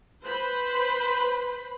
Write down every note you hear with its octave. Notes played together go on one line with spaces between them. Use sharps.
B4 C5 B5